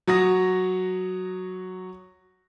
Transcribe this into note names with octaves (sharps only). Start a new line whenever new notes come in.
F#3 F#4 D#6 A#6